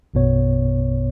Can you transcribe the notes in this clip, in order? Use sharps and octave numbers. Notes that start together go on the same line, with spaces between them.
A#1 F#2 B2 B3 C#5